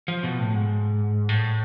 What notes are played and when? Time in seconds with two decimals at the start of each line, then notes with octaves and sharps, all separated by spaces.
0.08 F3
0.23 B2
0.38 A2
0.54 G#2
1.29 A2